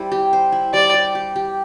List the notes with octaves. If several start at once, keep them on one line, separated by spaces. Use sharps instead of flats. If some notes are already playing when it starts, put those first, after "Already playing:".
Already playing: G3 E4 C5
G4
C5
E4
G3 D5
G4
G4
G4